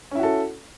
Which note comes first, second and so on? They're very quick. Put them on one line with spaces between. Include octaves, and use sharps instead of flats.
C#4 E4 F#4 A4